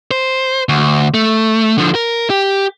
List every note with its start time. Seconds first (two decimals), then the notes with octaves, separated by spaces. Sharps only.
0.11 C5
0.69 D2
1.14 A3
1.78 D3 F3
1.95 A#4
2.30 G4